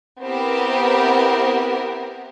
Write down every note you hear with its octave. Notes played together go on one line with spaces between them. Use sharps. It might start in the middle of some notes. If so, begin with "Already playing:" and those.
B3 C4 E4 G4 A#4